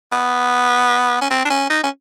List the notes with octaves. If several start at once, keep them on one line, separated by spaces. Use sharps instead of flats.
B3
C#4
C4
D4
C#4
D#4
C#4